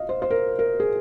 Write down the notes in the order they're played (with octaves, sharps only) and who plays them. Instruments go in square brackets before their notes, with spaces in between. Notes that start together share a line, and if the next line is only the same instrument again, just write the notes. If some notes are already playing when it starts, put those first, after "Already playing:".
Already playing: [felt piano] D#5 F5
C5
C5
A#4
A#4
G#4